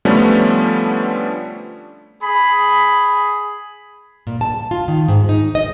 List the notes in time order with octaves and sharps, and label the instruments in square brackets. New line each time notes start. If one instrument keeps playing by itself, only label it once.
[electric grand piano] D3 F3 G3 A3 B3 C#4
[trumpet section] G#4 B5
[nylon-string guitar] A#2
A5
F4
D#3
G#2
D#4
D#5